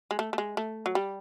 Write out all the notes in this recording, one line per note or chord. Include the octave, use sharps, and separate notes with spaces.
G#3
A3
A3
G#3
A3
F#3
G3